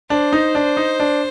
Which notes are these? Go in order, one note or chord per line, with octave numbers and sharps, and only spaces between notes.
D4 C5
D#4
D4
D#4
D4